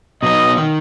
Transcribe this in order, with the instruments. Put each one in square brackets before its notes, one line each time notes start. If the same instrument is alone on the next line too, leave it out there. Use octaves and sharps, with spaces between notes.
[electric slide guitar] B2 F#3 B3 D#4 [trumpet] D#5
[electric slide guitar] D#3